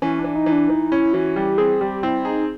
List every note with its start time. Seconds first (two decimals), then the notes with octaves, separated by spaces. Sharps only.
0.02 E3 C#4
0.19 D4
0.24 E3
0.36 D#4
0.46 E3
0.52 D4
0.69 E3 D#4
0.91 C#4 E4
1.13 E3 F#4
1.36 G3 G4
1.58 C4 G#4
1.81 G3 G4
2.03 C4 E4
2.25 D#4 G#4